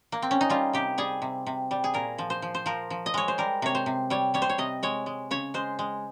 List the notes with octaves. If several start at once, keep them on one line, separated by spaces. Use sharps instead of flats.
A#3
C4
C#4
D#4
G3 F4
C3 G4
G3 G#4
C3
C3
G3
G#4
A#2 A#4
F3
C5
F3
C5
F3 A#4
F3
D#5
G#3 C#5
C5
G3 A#4
C3 C#5
C5
C3
G3 C#5
G3 C#5
C5
C#5
C3 D#5
G#3 C#5
G#3
C#3 C#5
G#3 C5
G#3